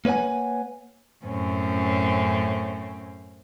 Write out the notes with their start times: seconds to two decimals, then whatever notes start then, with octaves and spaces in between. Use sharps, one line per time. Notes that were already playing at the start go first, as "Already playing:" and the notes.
0.05 A#3 B4 C#5 F#5 G#5
1.24 F#2 A2 C4 C#4